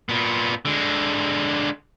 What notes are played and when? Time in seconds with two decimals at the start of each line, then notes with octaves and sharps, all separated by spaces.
0.09 A#2 B3
0.65 D3 G#3